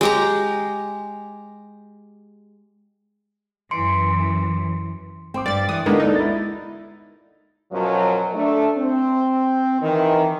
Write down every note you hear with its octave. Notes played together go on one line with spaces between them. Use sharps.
G#3 G4 A#5
F#2 E3 C6 C#7 D7
C4 G5 C6 D6
G2 D5 A6
E3 D#6
D3 G#3 A#3 B3 D#4
D#4 A4 D5
E4 A6
F#2 B2 F3 F#3
A3 D4
C4
D#3 E3